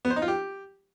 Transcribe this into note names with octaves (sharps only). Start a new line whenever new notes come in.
B3
C5
D#4
F4
G4